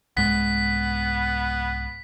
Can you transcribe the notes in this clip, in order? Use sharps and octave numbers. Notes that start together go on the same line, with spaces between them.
C2 G#2 G#3 B3 B6